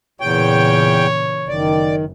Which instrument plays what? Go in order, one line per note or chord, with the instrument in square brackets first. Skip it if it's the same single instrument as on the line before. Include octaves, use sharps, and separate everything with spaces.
[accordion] E2 G5 [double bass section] A#2 C#3 E3 [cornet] C#5
[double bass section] F#1 [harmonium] D#3 [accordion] D5